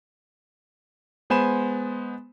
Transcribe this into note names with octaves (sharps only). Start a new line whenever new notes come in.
G#3 B3 C5 G#5 B5 E7